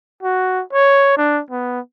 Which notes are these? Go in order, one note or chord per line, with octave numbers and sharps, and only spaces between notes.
F#4
C#5
D4
B3